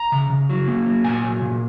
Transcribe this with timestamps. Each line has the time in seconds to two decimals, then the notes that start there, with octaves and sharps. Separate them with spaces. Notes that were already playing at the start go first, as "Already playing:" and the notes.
Already playing: A#5
0.12 C#3
0.30 C#3
0.49 F#3
0.68 A#3
0.86 F#3
1.04 A#2 G#5
1.23 F#3
1.42 A#2